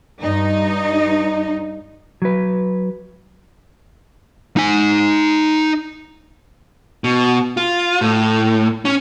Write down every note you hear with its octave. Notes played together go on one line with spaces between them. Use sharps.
G2 D#4
F#3 B4
D#4 G#5
B2
F4
A2
C#4